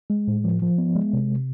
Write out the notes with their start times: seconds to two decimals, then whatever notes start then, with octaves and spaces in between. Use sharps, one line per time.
0.10 G#3
0.28 A2
0.44 F3
0.62 F3
0.78 B3
0.96 G#3
1.13 C3